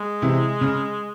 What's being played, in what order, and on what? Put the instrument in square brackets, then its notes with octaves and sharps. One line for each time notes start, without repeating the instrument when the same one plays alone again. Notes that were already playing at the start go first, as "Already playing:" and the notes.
Already playing: [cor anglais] G#3
[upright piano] C3 E3
C#3